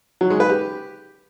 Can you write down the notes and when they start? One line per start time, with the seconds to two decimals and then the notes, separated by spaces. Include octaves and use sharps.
0.21 F#3
0.30 G#3
0.40 B4
0.50 G4